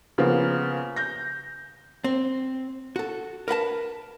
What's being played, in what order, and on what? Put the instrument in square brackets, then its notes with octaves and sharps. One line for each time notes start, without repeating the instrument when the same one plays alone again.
[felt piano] C#3 F3 A#3 B3
G6 A#6
[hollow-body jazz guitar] C4
F#4 A4
A#4 B4 F#5 A5